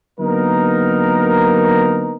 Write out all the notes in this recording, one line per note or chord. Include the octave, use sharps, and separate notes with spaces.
D3 F#3 A#3 B3 D#4 A#4